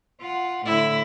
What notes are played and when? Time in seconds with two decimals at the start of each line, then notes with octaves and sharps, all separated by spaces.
0.20 F4 F#5
0.65 A2 D3 E4